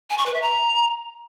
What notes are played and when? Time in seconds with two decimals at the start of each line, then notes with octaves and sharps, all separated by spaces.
0.10 G#5
0.18 C#6
0.26 B4
0.34 E5
0.42 A#5